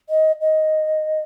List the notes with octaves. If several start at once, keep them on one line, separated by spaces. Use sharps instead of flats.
D#5
D#5